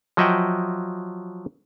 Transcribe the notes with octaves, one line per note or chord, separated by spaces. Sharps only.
F3 F#3 D#5 E5 F#5 G5